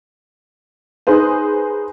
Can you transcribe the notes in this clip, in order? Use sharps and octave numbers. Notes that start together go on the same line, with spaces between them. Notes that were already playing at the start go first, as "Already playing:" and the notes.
D#4 G#4 B4 C5